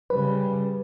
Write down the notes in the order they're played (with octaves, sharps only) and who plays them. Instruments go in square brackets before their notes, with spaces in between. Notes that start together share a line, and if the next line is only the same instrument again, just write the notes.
[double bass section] C#3 G3 [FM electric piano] B4